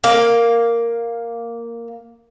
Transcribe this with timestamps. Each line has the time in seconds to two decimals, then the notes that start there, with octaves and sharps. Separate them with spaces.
0.04 A#3 F5